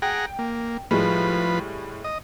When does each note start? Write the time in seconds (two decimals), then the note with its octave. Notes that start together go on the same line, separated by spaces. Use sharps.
0.02 G#4 F#5 G5 A#5
0.39 A#3
0.91 A2 F3 G3 G#3 B4
2.04 D#5